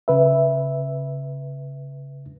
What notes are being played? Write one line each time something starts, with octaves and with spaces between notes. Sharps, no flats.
C#3 B4 E5